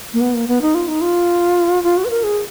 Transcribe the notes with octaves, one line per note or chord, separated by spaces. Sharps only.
A#3
B3
A#3
B3
D#4
F4
D#4
F4
F4
F#4
B4
A#4
G#4